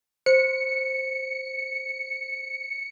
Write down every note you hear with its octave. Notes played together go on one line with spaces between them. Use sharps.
C5 C#7